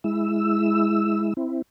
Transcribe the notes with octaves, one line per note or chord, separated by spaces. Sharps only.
G#3 E4 E6
C4 E4